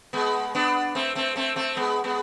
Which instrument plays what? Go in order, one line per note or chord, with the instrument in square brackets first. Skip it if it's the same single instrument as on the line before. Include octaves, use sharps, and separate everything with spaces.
[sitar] G#3 B3
B3 D4
A3 C4
A3 C4
A3 C4
A3 C4
G#3 B3
G#3 B3